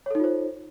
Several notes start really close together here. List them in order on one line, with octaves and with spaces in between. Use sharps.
C#5 A4 D#4 F4 C5